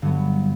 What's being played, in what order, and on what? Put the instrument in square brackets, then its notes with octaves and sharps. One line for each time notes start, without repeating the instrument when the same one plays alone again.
[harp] G2 F#3 B3 [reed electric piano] D3